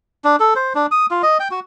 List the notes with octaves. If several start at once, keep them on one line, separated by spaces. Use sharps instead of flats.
D4
A4
C5
D4
D#6
F4
D#5
G5
F#4